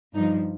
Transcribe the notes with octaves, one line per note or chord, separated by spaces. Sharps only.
G2 F3 D#4